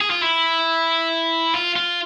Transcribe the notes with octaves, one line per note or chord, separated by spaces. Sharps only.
G#4
F4
E4
F4
F4